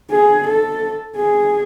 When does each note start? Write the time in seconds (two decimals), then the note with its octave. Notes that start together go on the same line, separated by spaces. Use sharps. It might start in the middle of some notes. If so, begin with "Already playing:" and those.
0.11 G#4
0.48 A4
1.17 G#4